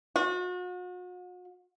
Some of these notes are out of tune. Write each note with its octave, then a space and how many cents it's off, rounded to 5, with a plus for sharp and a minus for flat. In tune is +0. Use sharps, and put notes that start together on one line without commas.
F#4 -40